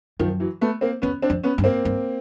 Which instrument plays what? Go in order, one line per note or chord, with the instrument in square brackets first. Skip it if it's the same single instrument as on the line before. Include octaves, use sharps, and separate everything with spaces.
[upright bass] F#2 [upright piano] D#3 F3
[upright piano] E3 F#3
A3 B3
A#3 C4
[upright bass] E2 [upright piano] B3 C#4
[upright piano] C4 D4
[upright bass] F2
[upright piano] B3 C#4
[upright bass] G2
[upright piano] A#3 C4
[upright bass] G2